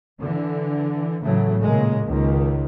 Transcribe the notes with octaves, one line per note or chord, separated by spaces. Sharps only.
D3 E3
A2 C#3 E3 F#3 A3
A#2 C#3 G#3 A#3
C#2 D#3